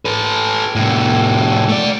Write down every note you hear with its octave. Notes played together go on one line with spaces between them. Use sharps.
A4 B4
C2 A2
A3 D5